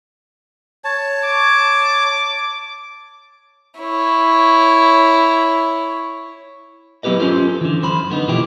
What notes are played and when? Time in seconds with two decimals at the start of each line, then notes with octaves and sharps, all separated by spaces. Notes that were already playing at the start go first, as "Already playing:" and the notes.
0.84 C#5 A5
1.24 D6
3.78 E4 C#5
7.03 F#3 B3 E4 G4 B4 D#5
7.20 C#4 F4 A4 C5
7.61 D3 E3
7.83 F#2 C5 B5
8.10 D3 B3 D#4
8.28 B2 E3 F3 A#3 E4 G4